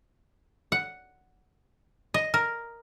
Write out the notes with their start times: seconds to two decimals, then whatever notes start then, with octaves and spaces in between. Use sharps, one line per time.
0.72 F#5
2.14 D#5
2.34 A#4